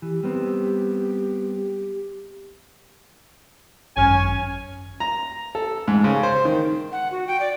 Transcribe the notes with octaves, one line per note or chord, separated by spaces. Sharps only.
E3 G4
G3 B3 C4
G#1 F#2 C#4 G#5 F6
A#5
A4
G#2
C#3
C5
D#3
F#5
F#4
G5
D5